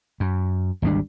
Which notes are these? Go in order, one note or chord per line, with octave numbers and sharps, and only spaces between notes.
F#2
G#1 D2 G3 D4